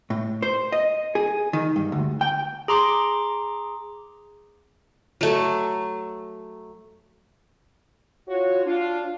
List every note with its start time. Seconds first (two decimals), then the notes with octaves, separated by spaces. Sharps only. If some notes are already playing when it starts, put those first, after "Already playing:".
0.10 A2
0.42 C5
0.72 D#5
1.15 G#4
1.53 D#3
1.76 G2
1.92 D2
2.21 G5
2.68 G#4 A#5 C6 D6
5.21 F#3 A3
8.28 F4 F#4 C#5
8.65 D4 F4